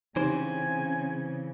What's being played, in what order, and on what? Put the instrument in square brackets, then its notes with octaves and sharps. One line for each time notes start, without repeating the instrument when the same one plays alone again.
[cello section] C#3 [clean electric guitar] E3 C4 C5 [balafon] D#4 G4 [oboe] G#5